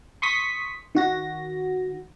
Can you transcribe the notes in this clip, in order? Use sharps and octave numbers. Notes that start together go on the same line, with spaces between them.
C6 C#6 D#6 B6
D#3 F#4 A#6